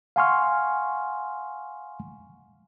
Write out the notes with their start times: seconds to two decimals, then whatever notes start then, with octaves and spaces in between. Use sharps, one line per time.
0.16 F5 F#5 G#5 C6 C#6 F6